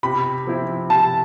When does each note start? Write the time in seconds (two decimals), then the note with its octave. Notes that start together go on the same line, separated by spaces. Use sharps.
0.03 C3 B5
0.47 F3 C4 E4
0.90 C3 A5